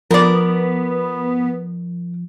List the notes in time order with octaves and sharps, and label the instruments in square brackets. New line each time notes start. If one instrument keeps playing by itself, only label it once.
[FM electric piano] F3 [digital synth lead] B3 [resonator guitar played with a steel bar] A#4 D5